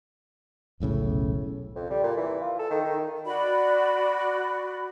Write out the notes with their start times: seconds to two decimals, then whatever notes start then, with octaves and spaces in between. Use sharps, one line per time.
0.80 E1 B1 A2 C#3
1.75 F2
1.90 G3
2.03 A#2
2.17 E3
2.41 F4
2.59 A4
2.71 D#3
2.85 D#3
3.26 F#4 D5 B5